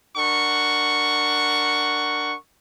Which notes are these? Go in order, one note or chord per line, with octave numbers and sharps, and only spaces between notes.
D4 A#4 F#5 C#6